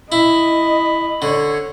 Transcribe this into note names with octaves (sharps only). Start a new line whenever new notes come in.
E4 D#5 B5
D3 C#5